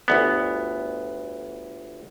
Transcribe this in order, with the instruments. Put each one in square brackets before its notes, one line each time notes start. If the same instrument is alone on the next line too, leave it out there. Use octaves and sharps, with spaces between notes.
[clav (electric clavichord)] G1 D2 B3